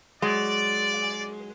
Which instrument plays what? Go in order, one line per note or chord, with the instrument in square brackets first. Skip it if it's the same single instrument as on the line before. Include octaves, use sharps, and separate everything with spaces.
[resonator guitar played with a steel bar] F#3 G#3 [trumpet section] D5